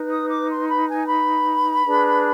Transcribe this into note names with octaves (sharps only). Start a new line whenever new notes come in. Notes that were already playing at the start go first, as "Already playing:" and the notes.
Already playing: D#4 B4
D#6
D6
C6
B5
G#5
B5
D4 G#4 B4